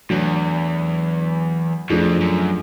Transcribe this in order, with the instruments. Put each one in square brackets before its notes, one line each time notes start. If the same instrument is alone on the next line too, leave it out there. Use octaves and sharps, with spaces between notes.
[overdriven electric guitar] E2 [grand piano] F#3 A3 D4
[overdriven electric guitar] F2 [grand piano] F3 A3 D4 F4 G#4
[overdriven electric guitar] F#2